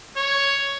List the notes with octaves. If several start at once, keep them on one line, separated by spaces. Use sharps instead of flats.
C#5